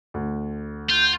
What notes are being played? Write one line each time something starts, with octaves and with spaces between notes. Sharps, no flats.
D2
F4 G6